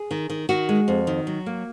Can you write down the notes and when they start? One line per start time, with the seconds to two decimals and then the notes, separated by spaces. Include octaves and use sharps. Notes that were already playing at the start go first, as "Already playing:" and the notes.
Already playing: G#4
0.11 D#3
0.30 D#3
0.49 D#3 F#4
0.69 G#3
0.88 F2
1.07 D#3
1.27 F#3
1.46 A#3